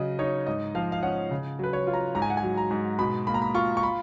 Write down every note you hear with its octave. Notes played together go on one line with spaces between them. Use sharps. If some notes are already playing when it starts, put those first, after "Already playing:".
Already playing: C#3 F#3 D#5
D#4 C#5
G#2 D#5
F3 F5
F5
C#4 F#5
C#3
F#3 B4
C#5
F4
A#5
G#2 A#5
G#5
F#5
G#5
F#3
A#5
G#2
B2 B5
A#3 B5
A#5
B5
F4 C#6
C#6
B5